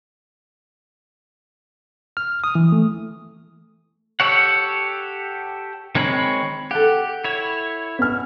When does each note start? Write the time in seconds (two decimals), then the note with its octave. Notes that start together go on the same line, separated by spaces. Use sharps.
2.17 F6
2.44 D#6
2.55 E3
2.72 A3
4.20 G4 A4 C#5 F#5
5.95 D#3 G#3 C4 C#5 B5
6.71 G4 A4 F#5
7.24 E4 C#5
7.99 B3 F6